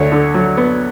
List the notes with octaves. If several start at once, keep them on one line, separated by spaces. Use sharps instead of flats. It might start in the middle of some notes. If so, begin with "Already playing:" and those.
Already playing: D2 C#5
D3
F#3
B3